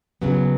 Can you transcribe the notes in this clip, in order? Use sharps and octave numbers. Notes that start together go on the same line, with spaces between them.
C#3 F#3 B3